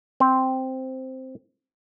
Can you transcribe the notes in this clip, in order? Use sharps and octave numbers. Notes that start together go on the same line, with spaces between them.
C4 C5